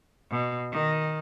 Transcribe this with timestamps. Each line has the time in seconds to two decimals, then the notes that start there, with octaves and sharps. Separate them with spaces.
0.31 B2
0.72 D#3